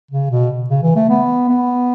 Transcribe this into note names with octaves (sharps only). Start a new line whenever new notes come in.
C#3
B2
C#3
E3
A3
B3
B3